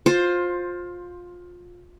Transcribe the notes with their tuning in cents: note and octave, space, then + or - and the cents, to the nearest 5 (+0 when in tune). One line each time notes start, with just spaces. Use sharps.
F4 +20 C5 +10